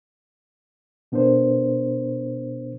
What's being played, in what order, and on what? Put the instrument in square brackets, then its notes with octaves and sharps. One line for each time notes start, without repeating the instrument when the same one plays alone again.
[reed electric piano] B2 B3 D4 A#4 C5